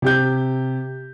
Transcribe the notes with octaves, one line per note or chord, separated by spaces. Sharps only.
C3 G4 G6